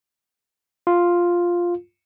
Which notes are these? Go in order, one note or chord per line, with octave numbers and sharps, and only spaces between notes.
F4